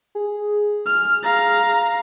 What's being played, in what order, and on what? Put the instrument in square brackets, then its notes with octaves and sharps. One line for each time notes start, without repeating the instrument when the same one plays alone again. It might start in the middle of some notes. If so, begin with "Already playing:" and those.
[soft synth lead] G#4
[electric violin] F6
F5 A#5